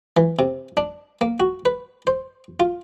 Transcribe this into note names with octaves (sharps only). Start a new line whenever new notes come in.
E3
C3
D4
A#3
F#4
B4
C5
F4